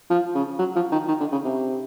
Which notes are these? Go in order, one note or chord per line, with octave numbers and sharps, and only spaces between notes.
F3
C#3
F#3
F3
D#3
D#3
D3
C#3
C3